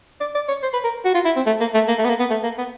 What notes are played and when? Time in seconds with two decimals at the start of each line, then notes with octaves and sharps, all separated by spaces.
0.21 D5
0.35 D5
0.48 C#5
0.63 C5
0.74 B4
0.84 A#4
1.05 F#4
1.14 F4
1.25 E4
1.36 C4
1.46 A3
1.60 A#3
1.74 A3
1.88 A#3
1.99 A3
2.05 B3
2.09 A#3
2.20 B3
2.30 A3
2.43 A#3
2.58 B3